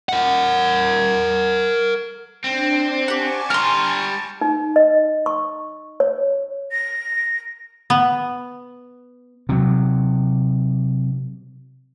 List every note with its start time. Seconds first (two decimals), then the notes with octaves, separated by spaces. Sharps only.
0.09 A#4 F#5
2.44 C4 D4
3.08 G4 F#5 G#5 A5 C#6
3.50 G3 A#5 C6 F6
4.41 D#4
4.76 D#5
5.26 C#6
6.00 C#5
6.71 A#6
7.90 B3
9.49 C3 F#3